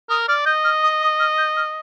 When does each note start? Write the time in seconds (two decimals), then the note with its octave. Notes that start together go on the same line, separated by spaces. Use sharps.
0.09 A#4 D#6
0.28 D5 F6
0.46 D#5 G6
0.64 F6
0.83 D#6
1.01 D#6
1.20 F6
1.38 G6
1.57 F6